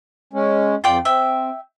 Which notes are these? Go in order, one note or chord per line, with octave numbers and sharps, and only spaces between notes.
G#3 C#4
F2 F4 D5 G5
C4 E5 G5